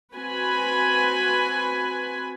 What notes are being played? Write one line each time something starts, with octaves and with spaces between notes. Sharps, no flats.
C4 F#4 B4 G#5 B5